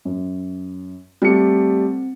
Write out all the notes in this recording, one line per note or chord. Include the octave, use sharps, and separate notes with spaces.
F#2
G3 A3 C4 C#7